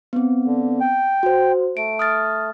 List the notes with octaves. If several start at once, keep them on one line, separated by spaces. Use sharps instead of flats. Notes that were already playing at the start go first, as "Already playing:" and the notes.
B3 C4
D3
G5
F#4 C5
A3 D7
D#6 F6 A6